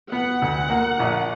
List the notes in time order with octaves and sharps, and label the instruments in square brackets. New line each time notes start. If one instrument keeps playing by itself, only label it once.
[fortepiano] B3 [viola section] F#5
[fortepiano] D2
A#3
A#1